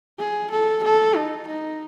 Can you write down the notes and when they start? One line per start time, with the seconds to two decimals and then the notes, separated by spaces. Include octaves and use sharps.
0.19 G#4
0.51 A4
0.84 A4
1.15 D#4
1.48 D#4